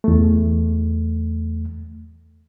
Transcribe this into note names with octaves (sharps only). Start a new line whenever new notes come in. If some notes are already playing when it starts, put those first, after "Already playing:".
E2 A3